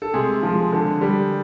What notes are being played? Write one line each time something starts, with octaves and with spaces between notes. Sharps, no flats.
A4
C3 G#3 G#4
F3 G#3
D3
G3